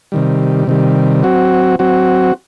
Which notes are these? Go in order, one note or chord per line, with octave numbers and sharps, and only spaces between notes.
C3 D#3 G3
C3 D#3 G3
F#3 C4 F#4
F#3 C4 F#4